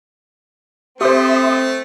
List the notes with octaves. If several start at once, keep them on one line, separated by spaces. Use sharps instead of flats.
A3 C4 G4 C5 E5 C6 D#6